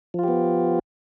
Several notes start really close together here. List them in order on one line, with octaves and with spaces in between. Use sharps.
F3 F4 G4 B3